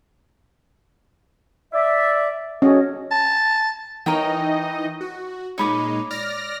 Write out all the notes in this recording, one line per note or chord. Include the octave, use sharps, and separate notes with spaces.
D5 E5
C#4 F#4 A4 D#5
A5
E3 D#4 A#4 C#5 D#5 G5
F#4
A#2 G#3 D#4 C#5 B5 D6
D5 F6 A#6